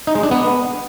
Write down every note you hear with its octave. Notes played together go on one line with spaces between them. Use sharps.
D#4
G#3
D4
B3